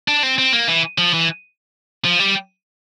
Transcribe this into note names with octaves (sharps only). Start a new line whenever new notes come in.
D4
C4
C4
A#3
E3
F3
E3
F3
G3